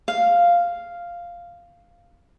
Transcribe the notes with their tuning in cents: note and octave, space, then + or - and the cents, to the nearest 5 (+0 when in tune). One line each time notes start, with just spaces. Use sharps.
F5 -5